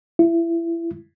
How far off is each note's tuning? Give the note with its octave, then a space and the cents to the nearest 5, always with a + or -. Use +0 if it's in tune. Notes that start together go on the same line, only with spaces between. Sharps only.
E4 +25